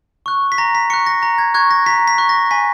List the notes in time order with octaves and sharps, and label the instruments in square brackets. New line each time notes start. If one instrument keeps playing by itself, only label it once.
[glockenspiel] C#6 F#6
B6
A#5 A#6
B6
C#6 F#6 C#7
A#6
A#5 A#6
G#6
C#6 F#6 G#6
A#6
A#5 B6
B6
C#6 F#6
A#6
G#5 B6